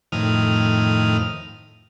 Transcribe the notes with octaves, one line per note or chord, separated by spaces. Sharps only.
F2 A2 D#3 D#6 F6